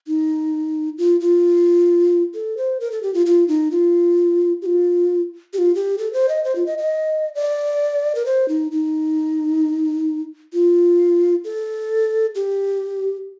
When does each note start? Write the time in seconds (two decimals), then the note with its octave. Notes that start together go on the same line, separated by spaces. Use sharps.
0.07 D#4
0.98 F4
1.20 F4
2.34 A4
2.57 C5
2.80 A#4
2.92 A4
3.03 G4
3.14 F4
3.26 F4
3.48 D#4
3.71 F4
4.62 G4
4.66 F4
5.53 G4
5.58 F4
5.75 G4
5.98 A4
6.13 C5
6.29 D#5
6.44 C5
6.56 F4
6.66 D#5
6.78 D#5
7.35 D5
8.15 A#4
8.26 C5
8.49 D#4
8.72 D#4
10.53 F4
11.44 A4
12.35 G4